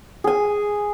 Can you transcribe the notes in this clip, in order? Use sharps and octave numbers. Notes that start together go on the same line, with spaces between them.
G#4 G#5